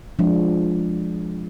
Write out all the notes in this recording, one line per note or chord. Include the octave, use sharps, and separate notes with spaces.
F3 G#3 D4